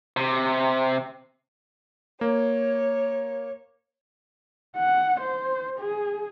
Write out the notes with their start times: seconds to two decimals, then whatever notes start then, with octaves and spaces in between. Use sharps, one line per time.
0.17 C3
2.21 A#3 C#5
4.77 F#5
5.21 C5
5.79 G#4